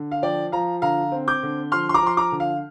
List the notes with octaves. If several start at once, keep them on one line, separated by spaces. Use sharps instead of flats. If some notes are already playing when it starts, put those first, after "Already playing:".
Already playing: D3
F5
F3 D5 G5
F3 F5 A#5
D3 F5 A#5
C4
D6 G6
D3
F3 C6 F6
C6
A#5 D6
F3 C6
A#5 D6
D3
F5